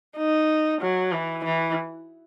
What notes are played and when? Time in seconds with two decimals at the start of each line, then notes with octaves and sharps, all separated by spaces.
0.17 D#4
0.81 F#3
1.12 E3
1.44 E3